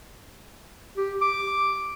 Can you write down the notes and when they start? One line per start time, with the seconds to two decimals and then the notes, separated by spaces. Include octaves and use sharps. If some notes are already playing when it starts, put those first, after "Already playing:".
0.97 G4
1.21 D6